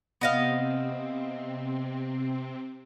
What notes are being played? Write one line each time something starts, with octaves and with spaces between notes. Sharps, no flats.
C3 B3 C4 D#5 F5